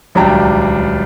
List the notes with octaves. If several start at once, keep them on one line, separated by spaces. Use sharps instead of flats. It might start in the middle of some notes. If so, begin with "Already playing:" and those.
D#1 C#2 F#3 D4 G4 A#5